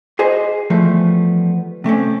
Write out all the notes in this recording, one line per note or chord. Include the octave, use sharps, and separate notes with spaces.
G4 G#4 C5 D#5
E3 F3 G3 A3 B3
C3 A3 C4 C#4